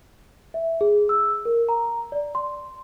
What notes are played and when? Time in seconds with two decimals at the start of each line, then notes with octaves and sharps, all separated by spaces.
0.54 E5
0.81 G#4
1.09 E6
1.45 A#4
1.69 A#5
2.12 D5
2.35 C6